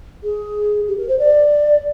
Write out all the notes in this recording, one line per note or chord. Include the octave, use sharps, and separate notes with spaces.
G#4
G4
A#4
C5
D5